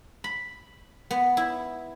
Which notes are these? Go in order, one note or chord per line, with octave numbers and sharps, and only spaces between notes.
B5
B3
E4